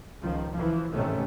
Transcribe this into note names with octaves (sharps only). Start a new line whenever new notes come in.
C#2 D#3 F3
E3 F3
A1 G#2 C3 D#3 A3 C#4